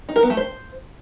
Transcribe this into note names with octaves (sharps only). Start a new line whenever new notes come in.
D#4
A#4
B3
A3
C5